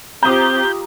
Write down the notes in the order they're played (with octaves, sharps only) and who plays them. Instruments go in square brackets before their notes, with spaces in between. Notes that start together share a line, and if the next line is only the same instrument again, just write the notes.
[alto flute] C4 [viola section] F4 G4 [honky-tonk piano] A#5 D#6 [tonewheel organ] G6